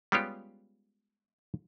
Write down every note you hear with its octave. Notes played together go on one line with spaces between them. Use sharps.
G3 G#3 B3 C#4 F4 G4